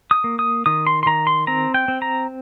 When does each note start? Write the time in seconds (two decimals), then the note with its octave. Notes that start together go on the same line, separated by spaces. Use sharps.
0.11 D#6
0.24 A#3
0.39 D#6
0.66 D#3 D#6
0.87 C6
1.03 C6
1.06 D#3 A#5
1.27 C6
1.47 C4 A#5
1.74 G5
1.88 C4
2.02 A#5